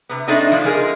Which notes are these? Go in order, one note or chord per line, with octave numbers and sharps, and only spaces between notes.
C3 B3
A3 C4 D4 D#4 D#5
D3 F3 F#3
F3 G#3 D#4 G#4 A#4